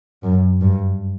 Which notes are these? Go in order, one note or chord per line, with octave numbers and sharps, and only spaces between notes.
F#2
G2